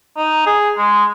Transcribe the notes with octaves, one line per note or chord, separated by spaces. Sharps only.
D#4
G#4
G#3